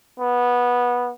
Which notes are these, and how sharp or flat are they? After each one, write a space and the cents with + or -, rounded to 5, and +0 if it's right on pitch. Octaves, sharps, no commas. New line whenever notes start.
B3 -15